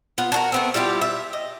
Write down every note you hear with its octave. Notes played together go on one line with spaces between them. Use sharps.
B3 F4
D4 F#4 A#4
A3 B3 C4
G3 E4 F4 G4
E5
D#5